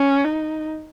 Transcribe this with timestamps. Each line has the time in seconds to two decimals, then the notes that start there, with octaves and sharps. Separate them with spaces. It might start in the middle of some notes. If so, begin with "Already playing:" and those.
Already playing: C#4
0.24 D#4